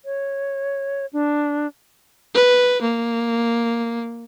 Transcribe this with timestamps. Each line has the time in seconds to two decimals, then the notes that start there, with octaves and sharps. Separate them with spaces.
0.05 C#5
1.13 D4
2.34 B4
2.82 A#3